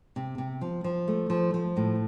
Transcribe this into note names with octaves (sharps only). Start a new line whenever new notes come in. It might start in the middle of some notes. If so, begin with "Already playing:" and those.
C3
C3
F3
F3
A3
F3
F3
A2